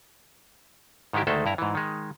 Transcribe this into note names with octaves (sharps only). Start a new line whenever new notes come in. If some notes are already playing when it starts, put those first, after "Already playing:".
G#2 D#3 G#3 E4 G4
D2 D#3 G#3 A3 A4 C5
G2 E4 A#5
G#2 E3
D#3 G#3